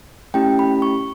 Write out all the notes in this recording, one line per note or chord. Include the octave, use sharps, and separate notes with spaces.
A3 C#4 E4 G4 G5
B5
C#6